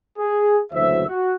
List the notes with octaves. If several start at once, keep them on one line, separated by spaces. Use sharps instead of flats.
G#4
F#1 D2 E3 F#3 C5 E5
F#4